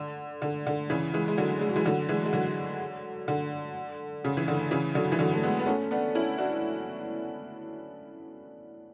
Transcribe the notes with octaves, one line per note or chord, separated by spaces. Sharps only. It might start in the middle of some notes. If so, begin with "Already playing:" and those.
Already playing: D3
D3
D3
C#3 E3
E3 G#3
G#3
D3 F#3
G#3
F#3
E3 G#3
D3 F#3
E3 G#3
G#3
D3 F#3
D3
C#3
E3
D3
C#3 E3
D3 F#3
E3
D3 F#3
A3
G#3 B3
B3
A3 C#4
B3 D4
C#4 E4
D4 F#4